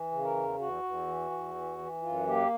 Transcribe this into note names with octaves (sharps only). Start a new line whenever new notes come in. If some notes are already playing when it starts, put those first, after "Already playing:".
Already playing: E3
C#3
A#4
E2
E2 F#4
E2
E3
E2
E3
E3
F#2 F4
A#3 G4